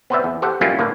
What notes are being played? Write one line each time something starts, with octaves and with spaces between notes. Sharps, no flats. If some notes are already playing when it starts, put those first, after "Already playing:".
B3 C4 B4 C5 D5 E5
E2
G4 A4 C5 F#5 G5
F#3 G3 A#3 C#4 E4 F4
A2 D3 A#3